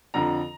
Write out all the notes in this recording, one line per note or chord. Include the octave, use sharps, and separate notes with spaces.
F2 D3 F3 A#5